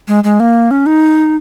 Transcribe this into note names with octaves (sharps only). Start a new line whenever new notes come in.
G#3
G#3
A#3
C#4
D#4